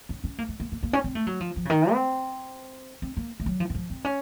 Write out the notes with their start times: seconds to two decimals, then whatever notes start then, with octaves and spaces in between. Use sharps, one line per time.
0.09 C#4
0.24 C#4
0.38 A#3
0.49 A3
0.60 A#3
0.72 A#3
0.83 A#3
0.93 C#4
1.04 C4
1.15 A3
1.27 F#3
1.40 F3
1.56 F3
1.65 C#3
1.70 D#3
1.92 C4
3.02 C4
3.17 A#3
3.40 A3
3.46 F#3
3.60 F3
3.70 D#3
3.75 F3
3.90 C4
4.05 C#4